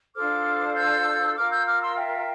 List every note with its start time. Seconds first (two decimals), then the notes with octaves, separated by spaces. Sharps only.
0.15 D4 F4 A4 C5 D6 F6
0.75 E6 G6
1.35 F4 A#4 D6 F6
1.50 E6 G6
1.65 D6 F6
1.80 C6 E6
1.95 E5 G5